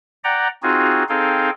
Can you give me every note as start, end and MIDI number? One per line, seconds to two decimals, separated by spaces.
0.24 0.48 74
0.24 0.48 78
0.24 0.48 79
0.24 0.48 82
0.63 1.04 60
0.63 1.04 63
0.63 1.04 65
0.63 1.04 66
0.63 1.04 68
1.09 1.50 60
1.09 1.50 63
1.09 1.50 68
1.09 1.50 69
1.09 1.50 77
1.09 1.50 79